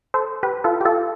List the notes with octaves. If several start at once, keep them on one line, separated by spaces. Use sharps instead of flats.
A4 C5
G4 B4
F4 A4
G4
F4 A4